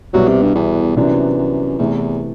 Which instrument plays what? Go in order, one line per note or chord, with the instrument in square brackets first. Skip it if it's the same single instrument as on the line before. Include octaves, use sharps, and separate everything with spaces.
[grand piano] C2 B2 G3 [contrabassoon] F#3
[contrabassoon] C3
G2
E2
[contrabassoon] F#2 [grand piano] C3 E3 B3 D4
[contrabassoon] F#2
[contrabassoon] E2 [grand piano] C3 E3 A3